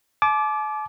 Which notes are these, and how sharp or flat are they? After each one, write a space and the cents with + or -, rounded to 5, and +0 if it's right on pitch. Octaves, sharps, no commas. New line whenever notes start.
A5 -45 D6 +0